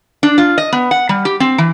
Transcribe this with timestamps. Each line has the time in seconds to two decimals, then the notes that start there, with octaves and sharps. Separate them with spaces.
0.23 D4
0.38 F4
0.58 D#5
0.73 B3
0.91 F#5
1.09 G3
1.25 G4
1.40 C4
1.58 E3